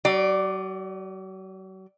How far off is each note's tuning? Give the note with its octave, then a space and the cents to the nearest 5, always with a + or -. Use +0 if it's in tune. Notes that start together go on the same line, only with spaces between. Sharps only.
F#3 +40 D5 +0